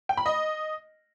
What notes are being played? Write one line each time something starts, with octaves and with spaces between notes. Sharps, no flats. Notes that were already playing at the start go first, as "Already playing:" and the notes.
G5
B5
D#5